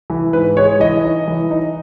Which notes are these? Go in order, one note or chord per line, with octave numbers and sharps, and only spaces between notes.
E3
G#2 B4
G#3 C#5
E3 D#5
D#4
E3
D#4